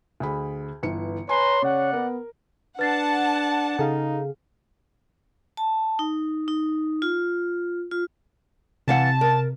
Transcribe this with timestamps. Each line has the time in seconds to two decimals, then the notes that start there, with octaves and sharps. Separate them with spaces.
0.20 D2 G#4 B5
0.83 G1 E3 C#7
1.29 B4 C#5 G#5 A#5 C6
1.62 C#3 D5 F#5
1.93 B3 A#4
2.79 D4 B4 F#5 A5 A6 C7
3.79 C#3 D#4 G#4 A4 F5
5.57 A5
5.99 D#4
6.48 D#4
7.02 F4
7.91 F4
8.88 C3 E3 F5 F#5 A5
9.21 A#4